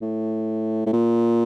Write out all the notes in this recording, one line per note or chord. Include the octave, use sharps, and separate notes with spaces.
A2
A2
A#2